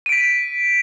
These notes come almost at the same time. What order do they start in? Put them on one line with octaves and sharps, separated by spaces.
D#7 D7 B6